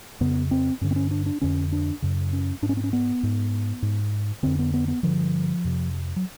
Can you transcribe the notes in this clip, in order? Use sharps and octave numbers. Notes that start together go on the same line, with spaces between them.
F2 C#3 B3
C4
G2 D3 C#4
C4
C#4
D4
D4
F2 D3 C#4
D4
F#2 C#3
C#4
G#2 D4
C#4
C4
C#4
B3
G#2
G#2
F2 D3 C4
B3
B3
B3
G2 D3 F3
F2 C3
F#3